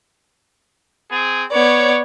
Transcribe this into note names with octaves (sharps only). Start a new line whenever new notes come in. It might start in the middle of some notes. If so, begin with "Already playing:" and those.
C4 G#4
B3 C#5 D5